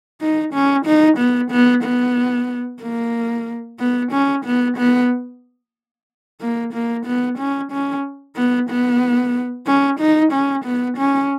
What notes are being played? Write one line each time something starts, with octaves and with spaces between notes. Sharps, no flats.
D#4
C#4
D#4
B3
B3
B3
A#3
B3
C#4
B3
B3
A#3
A#3
B3
C#4
C#4
B3
B3
C#4
D#4
C#4
B3
C#4